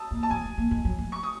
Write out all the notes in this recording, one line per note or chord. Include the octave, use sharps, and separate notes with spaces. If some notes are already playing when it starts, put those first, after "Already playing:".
Already playing: A5 D#6 E6
A#3
A5
A3 G#5
A3
A#3
G#3
F#3
A3
C#6
D#6